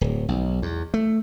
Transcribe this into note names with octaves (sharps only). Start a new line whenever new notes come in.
D1
B1
E2
A3